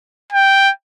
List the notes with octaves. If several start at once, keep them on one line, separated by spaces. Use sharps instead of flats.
G5